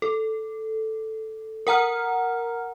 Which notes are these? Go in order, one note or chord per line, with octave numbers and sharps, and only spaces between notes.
A4
A#4 F#5 A#5 F6